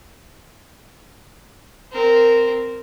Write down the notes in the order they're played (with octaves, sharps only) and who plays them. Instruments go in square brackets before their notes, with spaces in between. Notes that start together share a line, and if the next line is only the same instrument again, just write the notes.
[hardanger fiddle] C4 A#4